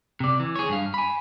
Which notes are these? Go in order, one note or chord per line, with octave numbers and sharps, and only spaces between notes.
C3 D5
E3
G#4 C#5
G2 F5
G#5 B5